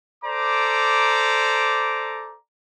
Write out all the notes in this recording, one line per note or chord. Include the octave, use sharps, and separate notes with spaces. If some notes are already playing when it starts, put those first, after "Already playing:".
A4 C5 D5 A#5 D6